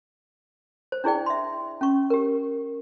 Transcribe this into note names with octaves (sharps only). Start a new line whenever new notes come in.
C5
D4 E4 G#4 D5 G5
E5 C6
C#4 C#6
G4 A#4